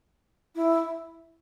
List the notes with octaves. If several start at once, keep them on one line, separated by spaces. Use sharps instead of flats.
E4